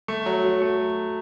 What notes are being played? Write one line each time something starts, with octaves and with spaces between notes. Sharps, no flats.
A3
F#3
F#3
A3